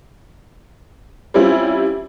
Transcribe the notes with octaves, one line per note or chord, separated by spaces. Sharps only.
G3 C4 C#4 E4 F4